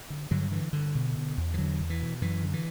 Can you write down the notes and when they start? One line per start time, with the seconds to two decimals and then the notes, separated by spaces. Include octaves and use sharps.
0.10 D3
0.31 G2 D3 F#3
0.52 D3 E3
0.73 G2 D3
0.95 B2
1.15 B2
1.37 E2
1.54 E3
1.58 E2 D3 F#3
1.80 E2
1.90 E3
2.01 B2
2.21 F#2 E3
2.43 D3
2.53 E3